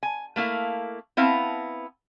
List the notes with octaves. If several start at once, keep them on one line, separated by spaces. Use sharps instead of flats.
G#5
A3 A#3 E4 F5
B3 C4 E4 F5 A5